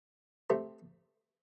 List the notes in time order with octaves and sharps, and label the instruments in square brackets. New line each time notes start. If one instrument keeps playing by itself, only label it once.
[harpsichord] A3 C4 G4